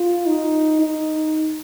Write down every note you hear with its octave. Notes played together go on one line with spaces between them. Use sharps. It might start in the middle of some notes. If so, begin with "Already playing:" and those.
Already playing: F4
D#4
D#4